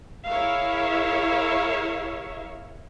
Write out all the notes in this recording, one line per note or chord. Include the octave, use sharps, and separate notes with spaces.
E4 G#4 A#4 C#5 E5 F5